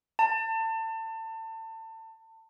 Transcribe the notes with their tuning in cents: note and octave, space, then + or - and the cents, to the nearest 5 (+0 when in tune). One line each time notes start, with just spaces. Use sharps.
A5 +30